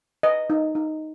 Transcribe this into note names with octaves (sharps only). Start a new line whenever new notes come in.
B4 D#5
D#4
D#4